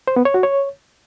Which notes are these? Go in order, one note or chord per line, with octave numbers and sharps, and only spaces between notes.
C5
B3
C#5
F#4
C#5